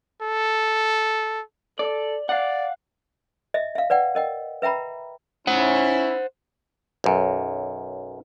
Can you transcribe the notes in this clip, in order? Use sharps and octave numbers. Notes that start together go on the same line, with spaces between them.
A4
A4 D5
D5 F5 F#5
D#5 E5
E5 F5
B4 D5 F#5 G5
A#4 D#5 G5
B4 E5 G5 A#5 B5
C#4 E4 C5 F#5
B1 F#2